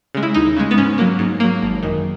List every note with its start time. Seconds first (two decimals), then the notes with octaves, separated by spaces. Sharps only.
0.15 C#3 G#3
0.23 E4
0.34 D#2 D#4
0.57 C#3 G#3
0.71 B3
0.78 G#2 C#4
0.98 F#3 A#3
1.19 G#2
1.40 F#3 A#3
1.62 G#1
1.83 F#2 D#3